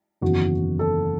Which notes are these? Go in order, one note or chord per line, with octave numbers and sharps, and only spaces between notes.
F#1 E2 D#3 F#4
A4